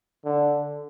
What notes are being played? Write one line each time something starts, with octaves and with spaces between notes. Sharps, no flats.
D3